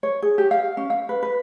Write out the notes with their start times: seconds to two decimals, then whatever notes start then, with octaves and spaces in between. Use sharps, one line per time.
0.03 C#5
0.22 G#4
0.38 G4
0.51 F5
0.77 C#4
0.90 F5
1.09 B4
1.23 B4